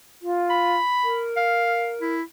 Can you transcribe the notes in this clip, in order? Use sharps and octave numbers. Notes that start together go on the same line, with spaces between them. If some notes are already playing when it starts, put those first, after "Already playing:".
F4
B5
A#4
F5
E4